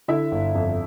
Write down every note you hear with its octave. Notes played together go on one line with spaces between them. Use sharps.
D3 E4 E5
G1
F2